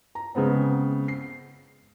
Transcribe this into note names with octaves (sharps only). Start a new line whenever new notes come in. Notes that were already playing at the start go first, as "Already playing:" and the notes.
A#5
C#3 G#3 B3 C4
C7